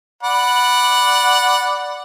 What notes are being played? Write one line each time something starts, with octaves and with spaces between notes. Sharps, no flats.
D5 F#5 B5